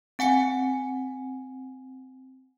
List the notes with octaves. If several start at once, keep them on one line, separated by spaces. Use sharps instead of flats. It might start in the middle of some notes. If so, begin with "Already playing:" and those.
C4 F#5 G#5 C#7